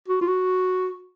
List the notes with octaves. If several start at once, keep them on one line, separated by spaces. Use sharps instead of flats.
F#4
F4
F#4